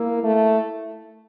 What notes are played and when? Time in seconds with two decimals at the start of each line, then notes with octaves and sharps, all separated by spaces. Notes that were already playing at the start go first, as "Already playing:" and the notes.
Already playing: A#3 E4 F5
0.23 A3